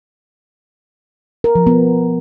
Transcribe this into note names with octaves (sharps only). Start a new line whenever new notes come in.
A#4
F3
B3